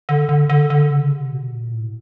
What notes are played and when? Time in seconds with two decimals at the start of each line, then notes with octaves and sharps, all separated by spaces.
0.09 D3
0.29 D3
0.50 D3
0.70 D3
0.90 C#3
1.12 C3
1.32 B2
1.52 A#2
1.73 A2